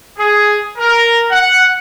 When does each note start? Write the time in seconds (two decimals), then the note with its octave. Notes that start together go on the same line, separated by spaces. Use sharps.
0.18 G#4
0.78 A#4
1.31 F#5